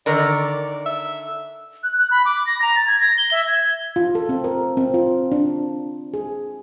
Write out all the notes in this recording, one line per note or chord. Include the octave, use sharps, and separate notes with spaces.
D3 D#3 A#4 D5
E5
F#6
F#6
B5
D6
A#6
A#5
A6
G#6
A#6
G7
E5
G#6
F4
A4
C4
A#4
C4
F4
D4
G#4